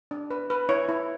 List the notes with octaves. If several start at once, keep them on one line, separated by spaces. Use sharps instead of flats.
D4
B4
B4
E4 C#5
E4